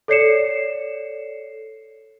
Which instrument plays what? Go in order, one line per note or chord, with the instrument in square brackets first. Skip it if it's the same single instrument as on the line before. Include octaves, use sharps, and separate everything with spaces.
[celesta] A4 C#5 D5 C7 C#7 E7